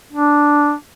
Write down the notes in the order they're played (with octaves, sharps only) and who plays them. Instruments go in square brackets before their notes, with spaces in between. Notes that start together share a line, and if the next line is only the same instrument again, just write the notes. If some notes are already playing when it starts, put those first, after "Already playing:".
[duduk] D4